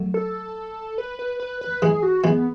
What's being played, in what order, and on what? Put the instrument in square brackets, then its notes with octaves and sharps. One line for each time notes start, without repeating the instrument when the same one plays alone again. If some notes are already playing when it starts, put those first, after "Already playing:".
Already playing: [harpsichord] F#3 A3
[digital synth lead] A4
B4
B4
B4
B4
[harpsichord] E3 G#3 [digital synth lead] G#4
[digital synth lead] F#4
[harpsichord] E3 G#3 [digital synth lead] B3